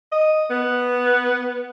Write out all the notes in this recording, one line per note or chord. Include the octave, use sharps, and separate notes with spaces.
D#5
B3